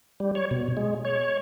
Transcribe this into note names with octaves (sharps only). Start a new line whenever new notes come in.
G3
C#5
B2
G#3
C#5